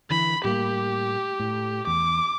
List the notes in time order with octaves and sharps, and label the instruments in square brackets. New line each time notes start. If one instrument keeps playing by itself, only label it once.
[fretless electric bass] D3 E3 [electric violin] B5
[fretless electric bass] A2 G3 A#3 [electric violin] G4
[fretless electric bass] A2
[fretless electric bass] E2 [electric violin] D6